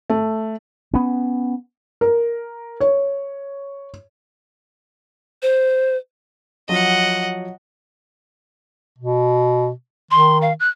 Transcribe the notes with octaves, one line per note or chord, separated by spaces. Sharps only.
A3
B3 C#4
A#4
C#5
C5
F3 F#3 D#5 F#5
B2
D#3 C6
F5
F#6